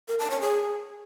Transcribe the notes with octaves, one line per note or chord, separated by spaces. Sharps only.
A#4
A5
C#5
G#4